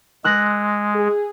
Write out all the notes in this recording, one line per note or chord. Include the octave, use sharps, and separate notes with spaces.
G#3 E6 F#6 A#6
G#4